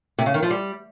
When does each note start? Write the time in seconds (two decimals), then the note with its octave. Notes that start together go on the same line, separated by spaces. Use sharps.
0.18 C3
0.26 C#3
0.34 D#3
0.42 F3
0.50 G3